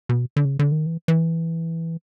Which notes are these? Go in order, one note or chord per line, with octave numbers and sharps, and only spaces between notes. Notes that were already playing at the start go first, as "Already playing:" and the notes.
B2
D3
C#3
D3
D#3
E3
E3